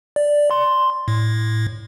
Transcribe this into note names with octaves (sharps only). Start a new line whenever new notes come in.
D5
C6
A2